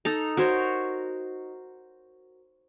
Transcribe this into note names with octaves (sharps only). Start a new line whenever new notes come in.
D#4 A4 A#5
F#4 A#4 C5 C#5